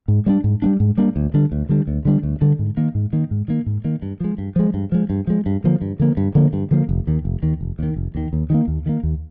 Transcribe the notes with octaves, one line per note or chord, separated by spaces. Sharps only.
G#2
G3 A#3 D4
G#2
G3 A#3 D4
G#2
G3 A#3 D4
D2
D3 G3 D4
D2
D3 G3 D4
D2
D3 G3 D4
D2
D3 G3 D4
G#2
D#3 A#3
G#2
D#3 A#3
G#2
D#3 A#3
G#2
D#3 A#3
G2
F3 G#3
G2
F3 G#3
G2
F3 G#3
G2
F3 G#3
G2
D3 F3 A#3
G2
D3 F3 A#3
G2
D3 F3 A#3
G2
D3 F3 A#3
F1
D#2 D#3
F1
D#2 D#3
F1
D#2 D#3
F1
D#2 D#3
D#2
D#3 G3 A#3
D#2
D#3 G3 A#3
D#2